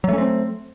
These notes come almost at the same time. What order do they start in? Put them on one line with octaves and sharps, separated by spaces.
F#3 A3 C#4 C4